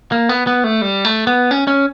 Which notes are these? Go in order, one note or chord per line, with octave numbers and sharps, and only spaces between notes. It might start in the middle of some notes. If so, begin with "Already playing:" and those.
A#3
B3
B3
A3
G3
A3
B3
C#4
C#4